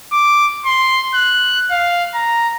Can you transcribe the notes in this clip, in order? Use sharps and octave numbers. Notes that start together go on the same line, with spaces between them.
D6
C6
F#6
F5
A#5